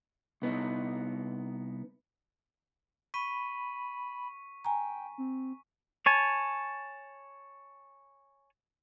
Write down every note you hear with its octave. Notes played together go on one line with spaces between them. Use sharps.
C2 B3 D#4
B5 C#6 B6 D#7
G5 G#5 A#5
C4
C#5 G#5 A5